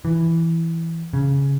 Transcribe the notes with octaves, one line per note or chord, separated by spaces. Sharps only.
E3
C#3